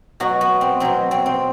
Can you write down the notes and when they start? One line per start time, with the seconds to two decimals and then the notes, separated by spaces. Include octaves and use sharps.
0.20 B2 F#3 F#4
0.41 B3
0.61 C4
0.80 B2 F#3 C4
1.11 C4
1.26 C4